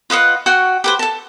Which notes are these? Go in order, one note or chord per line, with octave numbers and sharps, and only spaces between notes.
F4 B4 D#5 F#5
F#4 F#5 G5 C#6
G4 B4 C5
A4 A5